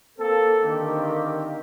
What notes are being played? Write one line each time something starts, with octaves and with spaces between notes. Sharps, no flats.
A#3 C4 A4
D3 D#3 A#3 C4 G4